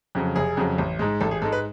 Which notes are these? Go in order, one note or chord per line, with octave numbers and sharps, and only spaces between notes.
F2 C#3 F#3
F1 G#4
F2 C#3 F#3
A1
G#2 G#3
A1 A4
G#4
G#2 G#3 A4
B4